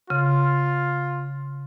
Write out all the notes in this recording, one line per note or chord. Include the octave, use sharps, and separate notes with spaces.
C#3 F4